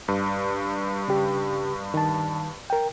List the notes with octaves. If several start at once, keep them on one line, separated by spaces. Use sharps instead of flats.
G2
C#3 G4
D#3 A5
A#4 G5